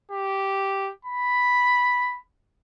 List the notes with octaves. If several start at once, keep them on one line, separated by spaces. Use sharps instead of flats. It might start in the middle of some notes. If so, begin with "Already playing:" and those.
G4
B5